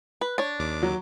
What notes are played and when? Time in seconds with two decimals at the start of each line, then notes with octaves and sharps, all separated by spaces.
0.21 B4
0.38 D4 C#5
0.59 D#2 D6
0.83 F#3